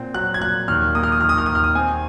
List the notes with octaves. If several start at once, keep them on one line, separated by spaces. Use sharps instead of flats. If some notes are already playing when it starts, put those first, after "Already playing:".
Already playing: A#2 C4
F#3 F#6
G#6
A#2 F#6
D#2 F6
A#3 D#6
F6
D#6
D#3 F6
D#6
F6
D#2 D#6
F6
D#6
C4 G#5